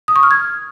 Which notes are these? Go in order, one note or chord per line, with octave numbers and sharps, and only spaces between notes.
D#6
C#6
F6
G#6